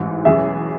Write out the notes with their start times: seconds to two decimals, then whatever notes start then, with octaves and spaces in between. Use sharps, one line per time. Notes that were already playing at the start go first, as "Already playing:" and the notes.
Already playing: A1 G#2 E3
0.25 E2 B2 F#3 C#4 G#4 E5